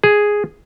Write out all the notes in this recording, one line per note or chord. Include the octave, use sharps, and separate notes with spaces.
G#4